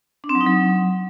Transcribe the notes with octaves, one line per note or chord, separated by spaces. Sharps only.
D4
C4
F#3
D#4
F#3